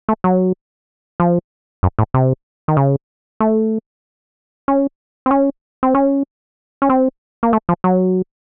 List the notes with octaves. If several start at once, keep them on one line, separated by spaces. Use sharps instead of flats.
A3
F#3
F3
F#2
A2
C3
D#3
C#3
A3
C#4
C4
C#4
C4
C#4
C#4
C4
A#3
A3
F3
F#3